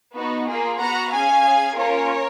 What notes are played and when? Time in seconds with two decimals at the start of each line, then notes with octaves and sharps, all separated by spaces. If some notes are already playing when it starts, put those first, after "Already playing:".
0.15 B3 D#4 F#4
0.47 A#3 F4 G#4
0.79 B3 F#4 F#5 A#5
1.11 C#4 G#4 F5 G#5
1.44 C#4 G#4
1.76 A#3 C#4 F4 A#4 C#5